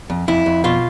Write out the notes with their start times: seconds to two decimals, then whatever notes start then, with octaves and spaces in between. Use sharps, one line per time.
0.10 F2
0.28 F2 E4
0.46 F2
0.64 B2 F4